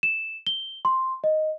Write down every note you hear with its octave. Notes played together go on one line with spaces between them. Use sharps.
E7
G7
C6
D#5